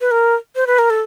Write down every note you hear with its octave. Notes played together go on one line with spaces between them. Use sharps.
B4
A#4
C5
B4
A#4
A4